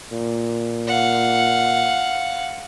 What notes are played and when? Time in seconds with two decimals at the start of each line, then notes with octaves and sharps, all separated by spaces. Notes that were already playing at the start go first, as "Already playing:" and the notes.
0.13 A#2
0.87 F5 F#5